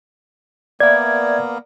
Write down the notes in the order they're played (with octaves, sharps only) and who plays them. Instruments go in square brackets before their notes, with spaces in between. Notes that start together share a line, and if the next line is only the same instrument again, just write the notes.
[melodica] A#3 B3 A#4 [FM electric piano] D5 [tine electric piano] E5 G#6